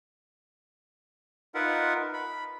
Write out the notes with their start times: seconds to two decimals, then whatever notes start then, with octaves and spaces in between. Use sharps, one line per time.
1.55 D#4 F4 A#4 B4 E5 F#5
2.14 B5